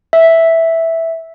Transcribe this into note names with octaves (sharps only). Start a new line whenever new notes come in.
E5